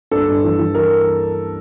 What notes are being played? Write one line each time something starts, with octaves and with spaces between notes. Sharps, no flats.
G2 A4
G2
E3
E3
E3 A#4